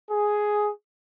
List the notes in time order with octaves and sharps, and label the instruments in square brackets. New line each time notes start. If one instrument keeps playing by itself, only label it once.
[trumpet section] G#4